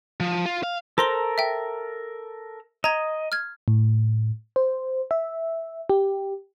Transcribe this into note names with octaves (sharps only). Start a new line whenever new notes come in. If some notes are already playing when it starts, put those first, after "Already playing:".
F3
F4
F5
A4 A#4 C5 A#5 C6 G7
E5 G5
D#5 A#5 G#6
F6 G#6
A2
C5
E5
G4